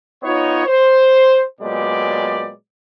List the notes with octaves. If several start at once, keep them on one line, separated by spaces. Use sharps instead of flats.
B3 D#4 F4 C#5
C5
A#2 F#3 G#3 B3 G4 D5